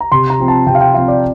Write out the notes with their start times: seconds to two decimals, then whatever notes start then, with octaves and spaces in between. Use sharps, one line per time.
0.01 A#5
0.12 C3 C6
0.30 A#5
0.39 F3 C4
0.48 A5
0.67 C3 G5
0.75 F5
0.81 G5
0.94 F3 C4 F5
1.08 D5